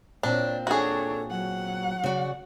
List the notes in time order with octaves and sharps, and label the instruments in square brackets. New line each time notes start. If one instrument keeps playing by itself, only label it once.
[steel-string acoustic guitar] A#2 C4 [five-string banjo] D4 [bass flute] C#5
[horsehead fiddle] D4 C#5 [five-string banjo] F#4 G#4 [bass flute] A4
[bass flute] F#3 [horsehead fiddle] F#5
[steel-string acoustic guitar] C#3 F#4 D5